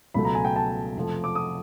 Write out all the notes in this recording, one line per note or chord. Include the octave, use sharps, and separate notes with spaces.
C#2 B2 F#3 A3 B5
A#5
G#5
G5
A5
F2 C3 F3 A3
D6
D#6